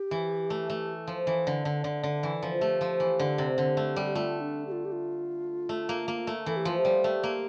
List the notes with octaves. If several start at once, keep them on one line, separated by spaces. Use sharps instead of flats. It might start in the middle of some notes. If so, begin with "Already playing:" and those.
Already playing: G4
E3
A3
A3
F3
E3
D3
D3
D3
D3
E3
F3
F4
A3 G4
F3
E3
D3
C3
D3
A3
G3
G4
A3 F4
D4
G4
F4
G4
F4
A3
A#3
A#3
A3
E3 A4
G4
F3 F4
G4
G3
A3
A#3